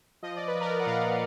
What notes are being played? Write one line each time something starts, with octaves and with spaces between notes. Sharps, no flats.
F3 D#5
F3 D5
B4
F3
A#4 D5
F3
F#5
A#2 D5 F5
A#2